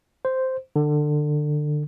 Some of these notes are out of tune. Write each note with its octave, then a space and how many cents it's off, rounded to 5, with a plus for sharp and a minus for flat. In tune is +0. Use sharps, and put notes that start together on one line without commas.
C5 -5
D3 +25